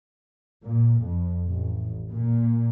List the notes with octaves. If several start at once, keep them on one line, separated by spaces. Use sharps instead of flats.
A#2
F2
A1
A#2